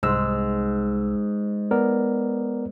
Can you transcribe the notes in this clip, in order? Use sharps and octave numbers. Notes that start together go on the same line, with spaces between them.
C2 G#2 E6
B3 A#4 D5